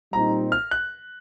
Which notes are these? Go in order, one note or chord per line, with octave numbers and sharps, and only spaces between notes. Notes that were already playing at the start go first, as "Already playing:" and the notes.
A#2 G3 C4 D#4 A#5
F6
F#6